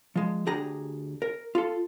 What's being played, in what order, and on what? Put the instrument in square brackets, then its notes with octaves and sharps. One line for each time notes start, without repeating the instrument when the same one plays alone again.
[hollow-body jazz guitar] F3 G#3
D2 D4 G4 G#4 A#5
A#4
F4 A4